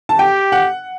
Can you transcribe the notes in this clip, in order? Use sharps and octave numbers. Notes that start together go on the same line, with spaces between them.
A5
G4 G5
F#5